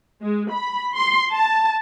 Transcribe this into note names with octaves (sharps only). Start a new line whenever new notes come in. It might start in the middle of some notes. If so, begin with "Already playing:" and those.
G#3
B5
C6
A5